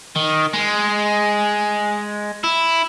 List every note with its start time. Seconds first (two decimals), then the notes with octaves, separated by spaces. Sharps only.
0.16 D#3
0.54 G#3
2.44 E4